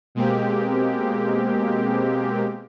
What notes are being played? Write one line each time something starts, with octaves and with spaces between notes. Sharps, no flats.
B2 G#3 A#3 C4 G4